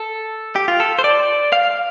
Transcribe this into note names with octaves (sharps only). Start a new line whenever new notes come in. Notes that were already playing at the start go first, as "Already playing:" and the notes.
Already playing: A4
G4
F4
A4
C5
D5
F5